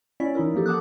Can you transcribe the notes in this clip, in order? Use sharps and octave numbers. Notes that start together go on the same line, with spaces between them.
C#4 E4 C#5 D5 B6
E3 D#4 E4 A#4
F3 A#3 G4 A4
F#5 A5 D6 D#6 F#6